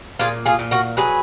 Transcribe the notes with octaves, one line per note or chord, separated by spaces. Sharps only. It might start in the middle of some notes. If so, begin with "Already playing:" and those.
A#2 F4 G#4
F4 G#4
A#2
F#4 A#4
F#3 G#4 B4